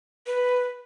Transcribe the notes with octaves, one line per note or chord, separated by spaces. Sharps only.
B4